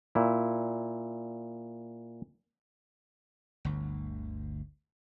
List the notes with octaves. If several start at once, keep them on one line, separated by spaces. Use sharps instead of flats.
A#2 E4
G1 D2